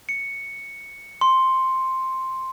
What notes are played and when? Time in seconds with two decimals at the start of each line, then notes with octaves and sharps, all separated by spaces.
0.09 C#7
1.21 C6